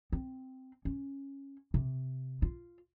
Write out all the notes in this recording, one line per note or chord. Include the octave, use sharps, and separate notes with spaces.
C4
C#4
C3
F4